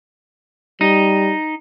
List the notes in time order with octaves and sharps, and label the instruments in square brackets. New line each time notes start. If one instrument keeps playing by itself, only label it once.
[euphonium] G3 [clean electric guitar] D#4